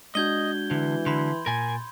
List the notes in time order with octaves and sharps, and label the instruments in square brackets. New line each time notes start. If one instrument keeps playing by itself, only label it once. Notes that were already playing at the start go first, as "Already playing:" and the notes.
[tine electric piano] G#3 D4 F#4 [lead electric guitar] D#5 [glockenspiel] G6 G#6 G7
[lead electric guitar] D3 [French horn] E3
[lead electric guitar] D3 [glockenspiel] B5 C6
[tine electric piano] A#2 A6 [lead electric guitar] A#4 G#5